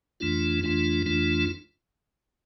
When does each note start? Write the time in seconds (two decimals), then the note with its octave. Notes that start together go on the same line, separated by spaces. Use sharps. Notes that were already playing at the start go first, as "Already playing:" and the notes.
0.20 F2 E3 A3 D4 F4
0.63 F2 E3 A3 D4 F4
1.06 F2 E3 A3 D4 F4